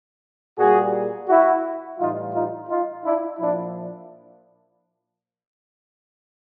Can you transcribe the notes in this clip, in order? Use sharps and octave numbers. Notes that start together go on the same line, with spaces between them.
A#2 G3 F#4 G#4
E4 F#4
A2 E3 G3 D#4 F4
D#4 F4
D#4 F4
D4 E4
A#2 F3 D4 E4